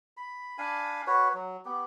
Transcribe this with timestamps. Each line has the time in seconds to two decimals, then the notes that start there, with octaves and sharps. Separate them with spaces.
0.17 B5
0.58 D4 F5 G#5 B5
1.07 F#4 B4 C#5
1.34 F#3
1.65 B3 G4